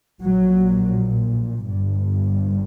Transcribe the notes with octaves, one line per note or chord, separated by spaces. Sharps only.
A#1 A#2 F#3
G1 G2